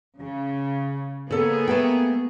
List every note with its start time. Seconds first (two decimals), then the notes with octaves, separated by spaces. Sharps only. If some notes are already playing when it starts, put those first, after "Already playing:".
0.19 C#3
1.30 C#3 A#3 B3 G#4 A4
1.67 A3 B4 G5